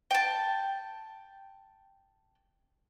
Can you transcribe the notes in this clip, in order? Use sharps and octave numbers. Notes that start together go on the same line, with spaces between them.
G5 A5